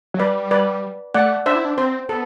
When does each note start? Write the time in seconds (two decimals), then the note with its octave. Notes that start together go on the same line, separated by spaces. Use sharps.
0.14 F#3
0.20 G3 B4 D5
0.51 B4 D5
1.14 A3 D5 F#5
1.46 D4 C5 E5
1.55 E4
1.65 D4
1.77 C4 C5
2.09 B3 A4